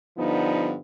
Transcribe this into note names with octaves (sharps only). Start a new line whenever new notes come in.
G2 D3 F3 B3 D#4